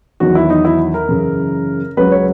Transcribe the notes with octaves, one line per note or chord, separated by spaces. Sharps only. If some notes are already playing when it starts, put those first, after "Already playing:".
E2 D#3 F#3 F#4
E4
D#4
E4
A#4
F#2 C#3 E3
C#2 C#3 F#3 B4
C#5